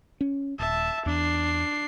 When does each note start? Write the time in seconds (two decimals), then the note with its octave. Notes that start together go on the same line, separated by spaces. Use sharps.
0.21 C#4
0.59 D#1 E5 A5
1.06 E2 D4 C7